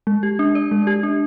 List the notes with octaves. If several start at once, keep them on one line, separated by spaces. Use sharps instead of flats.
G#3
G4
D4
D5
G#3
G4
D4